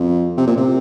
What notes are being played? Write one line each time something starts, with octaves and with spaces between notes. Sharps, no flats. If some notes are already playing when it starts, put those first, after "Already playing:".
Already playing: F2
C3
A#2
C3